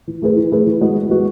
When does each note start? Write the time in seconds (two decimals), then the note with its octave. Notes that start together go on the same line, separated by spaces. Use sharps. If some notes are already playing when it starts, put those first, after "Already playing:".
0.07 E3
0.22 A3 E4 G#4 B4
0.37 E3
0.52 A3 E4 G#4 B4
0.67 E3
0.81 G#3 B3 F#4
0.96 E3
1.10 G#3 B3 F#4